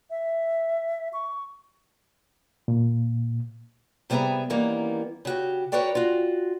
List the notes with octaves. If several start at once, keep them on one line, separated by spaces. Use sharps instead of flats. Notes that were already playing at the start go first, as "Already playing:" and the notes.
E5
C#6
A#2
C3 G3 B3 G#4 E5 A#5
D#3 E3 G3 A#3 B3 C#4
C#3 F#4 G4
F#4 A#4 B4 C#5 D5 G5
F4 F#4